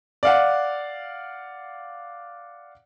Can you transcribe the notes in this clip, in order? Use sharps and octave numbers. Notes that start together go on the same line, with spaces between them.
D5 F5 F#5